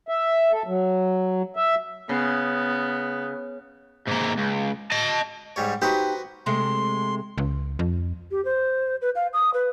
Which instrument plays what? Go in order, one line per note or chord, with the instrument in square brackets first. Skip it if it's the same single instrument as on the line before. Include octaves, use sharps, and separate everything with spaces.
[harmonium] E5
A4
F#3
E5
[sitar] C#3 [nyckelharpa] B3
[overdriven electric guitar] G#2 A#3
C#2
D#5 A5
[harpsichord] G#2 G3 C#5
[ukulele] D#4 G4 [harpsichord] F#4 B4 C5
[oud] C3 G#3 A3 [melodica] C6
[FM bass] C#2
F2
[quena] G4
C5
B4
F5
D#6
B4